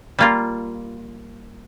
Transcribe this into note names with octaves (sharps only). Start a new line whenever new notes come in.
G3 A#3 F4